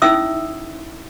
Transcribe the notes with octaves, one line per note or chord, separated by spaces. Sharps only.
C#4 D#4 E4 E5 D#6 E6